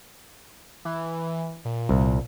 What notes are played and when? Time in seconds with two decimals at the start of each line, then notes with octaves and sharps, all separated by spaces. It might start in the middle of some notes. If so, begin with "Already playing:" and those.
0.85 E3
1.65 A#2
1.89 C2